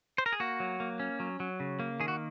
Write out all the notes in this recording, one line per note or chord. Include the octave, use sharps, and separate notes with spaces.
C5
A#4
G#4
A#3 F#4
F#3
A#3
C#4
F#3
F#3
C#3
A#3
D#3 G#4
F#4